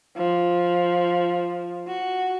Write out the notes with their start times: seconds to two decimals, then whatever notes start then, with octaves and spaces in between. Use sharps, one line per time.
0.17 F3
1.88 F#4